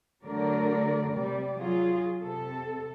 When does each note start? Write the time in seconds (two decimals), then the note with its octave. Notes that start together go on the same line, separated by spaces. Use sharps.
0.24 D3 F#3 A3 A#4 D5
1.14 C3 G3 D5
1.57 F#3 F4 G#4
2.22 C3 A4